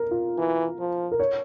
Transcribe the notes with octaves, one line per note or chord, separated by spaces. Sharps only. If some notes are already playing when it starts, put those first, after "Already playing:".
Already playing: A#4
F4
E3
F3
A#4
C#5